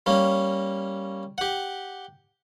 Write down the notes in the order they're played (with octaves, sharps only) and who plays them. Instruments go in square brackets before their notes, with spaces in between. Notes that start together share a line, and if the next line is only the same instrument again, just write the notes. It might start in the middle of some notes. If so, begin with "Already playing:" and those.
[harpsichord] G3 A#3 C#4
G4 F#5